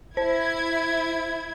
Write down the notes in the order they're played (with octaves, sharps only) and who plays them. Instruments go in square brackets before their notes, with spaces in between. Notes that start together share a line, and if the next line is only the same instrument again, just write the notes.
[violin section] E4 G#6 [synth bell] C5